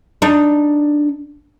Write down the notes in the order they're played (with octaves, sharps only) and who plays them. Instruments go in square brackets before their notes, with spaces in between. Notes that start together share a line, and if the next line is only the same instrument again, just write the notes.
[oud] D4 D#4